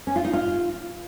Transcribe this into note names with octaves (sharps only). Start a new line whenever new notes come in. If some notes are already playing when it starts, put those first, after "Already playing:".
C#4
F4
D#4
F4